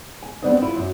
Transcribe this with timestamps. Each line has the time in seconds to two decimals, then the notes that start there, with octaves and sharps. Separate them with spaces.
0.23 G#5
0.42 G3 B3 C4 D4 B4 D#5
0.62 E4 F4
0.75 F#2 F#3